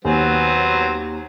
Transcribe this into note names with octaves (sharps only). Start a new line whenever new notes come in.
D#2 F#3 B3 C4 G#5